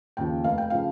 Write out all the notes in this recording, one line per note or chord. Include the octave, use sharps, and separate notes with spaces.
D#2 C#3 F3 G5
F1 F5
G5
C#3 F3 F5